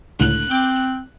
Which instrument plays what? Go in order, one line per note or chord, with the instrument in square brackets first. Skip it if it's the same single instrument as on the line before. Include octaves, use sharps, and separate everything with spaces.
[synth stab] C#2 A2 D3 [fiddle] F#6
[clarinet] C4 [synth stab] G5 D6 G6